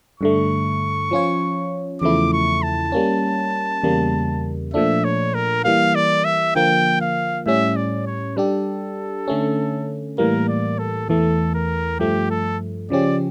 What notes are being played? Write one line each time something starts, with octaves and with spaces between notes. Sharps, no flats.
G2 D3 A3 C#6
F3 C#4 F4 C#5
E2 C#3 F3 A3 E4 D6
C#6
A5
G3 A#3 C#4
E2 C#3 G3 A#3
A#2 F3 A3 D4 E5
C#5
A#4
E3 G3 A#3 F5
D5
E5
D3 F3 A#3 G5
F5
A2 G3 C#4 E5
D5
C#5
G3 D4 G4 A4
D3 A3 C#4
A2 E3 G3 A#3 A#4
D5
A4
E2 E3 A3 A4
A#4
G2 F3 A3 G4
A4
C#3 F3 C#4 G4 D5